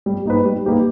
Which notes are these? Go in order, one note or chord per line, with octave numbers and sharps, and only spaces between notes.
G3
A#3 D#4 G4 B4
G3
A#3 D#4 G4 B4